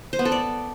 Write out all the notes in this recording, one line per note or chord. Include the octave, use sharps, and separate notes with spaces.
C5
B3
A4
D5